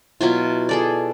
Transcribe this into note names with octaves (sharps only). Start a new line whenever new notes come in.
B2 F#3 E4 F4
G#4 A4 D5